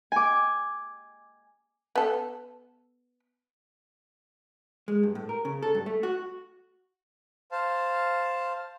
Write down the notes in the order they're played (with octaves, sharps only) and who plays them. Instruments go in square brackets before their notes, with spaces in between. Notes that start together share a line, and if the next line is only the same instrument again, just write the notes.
[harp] G#5 D6
[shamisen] B3 A4
[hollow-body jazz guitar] G#3
G2
A2
A#4
C#3
A4
G2
A3
F#4
[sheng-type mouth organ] C5 F5 A5